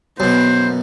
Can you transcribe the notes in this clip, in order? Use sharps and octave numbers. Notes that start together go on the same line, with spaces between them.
F#2 B2 B3 C5